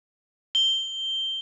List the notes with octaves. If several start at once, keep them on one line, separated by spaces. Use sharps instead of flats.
G7